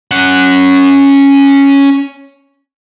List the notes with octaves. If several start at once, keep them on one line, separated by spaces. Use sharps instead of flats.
C#4 F#5